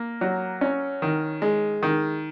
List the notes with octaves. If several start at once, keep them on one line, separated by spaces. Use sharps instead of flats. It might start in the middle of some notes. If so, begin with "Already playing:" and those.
Already playing: A#3
F#3
C#4
D#3
G#3
D#3